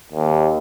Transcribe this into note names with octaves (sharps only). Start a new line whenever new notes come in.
D#2